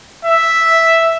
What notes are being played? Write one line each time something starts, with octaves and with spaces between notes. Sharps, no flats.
E5